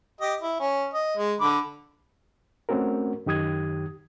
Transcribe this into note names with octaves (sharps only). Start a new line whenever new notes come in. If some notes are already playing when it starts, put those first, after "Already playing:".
G4 D#5
E4
C#4
D#5
G#3
D3 B5 D6
A3 C4 C#4 F#4 A#4
F#2 D#3 G4 D#6 G#6